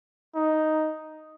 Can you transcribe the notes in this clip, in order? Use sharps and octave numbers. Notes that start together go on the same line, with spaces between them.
D#4